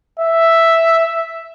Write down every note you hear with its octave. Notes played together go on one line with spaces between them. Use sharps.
E5